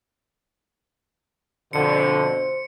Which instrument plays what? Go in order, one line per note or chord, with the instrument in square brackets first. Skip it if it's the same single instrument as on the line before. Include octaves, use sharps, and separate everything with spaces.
[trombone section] F2 B2 D3 [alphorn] C5 [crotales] C#7